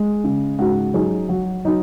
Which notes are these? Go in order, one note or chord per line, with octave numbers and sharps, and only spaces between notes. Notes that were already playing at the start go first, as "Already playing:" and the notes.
Already playing: G#3
C#3
G#2 F#4
F#3 D#4 G#4
F#3 F#4
F#3 D#4